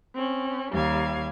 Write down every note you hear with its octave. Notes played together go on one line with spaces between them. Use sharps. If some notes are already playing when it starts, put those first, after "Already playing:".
C4 C#4
D#2 G3 F5 G#6